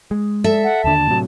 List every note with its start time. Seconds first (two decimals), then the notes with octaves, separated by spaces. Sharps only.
0.11 G#3
0.44 A4 E5
0.64 F#5
0.84 D#2 D3 A5
1.07 A2 C3 F#3